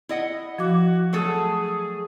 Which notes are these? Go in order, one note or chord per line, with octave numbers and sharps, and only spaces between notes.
E4 D#5 F#5
F3 F#4 D6
F#3 A3 G#4 A4